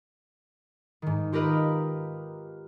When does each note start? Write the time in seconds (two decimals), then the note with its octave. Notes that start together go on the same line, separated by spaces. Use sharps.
1.02 G#2 D#3
1.32 F4 G4 A#4 B4 D#5